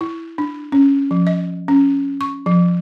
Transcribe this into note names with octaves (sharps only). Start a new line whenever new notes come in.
E4
D4
C#4
F3
D#5
C#4
C#6
F3